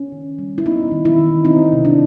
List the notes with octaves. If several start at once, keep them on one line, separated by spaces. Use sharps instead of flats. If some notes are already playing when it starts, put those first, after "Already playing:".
Already playing: C#4
D#3
G3
E4
B3 D#4
D#3
E4
D#3
C4 D#4
C3
D4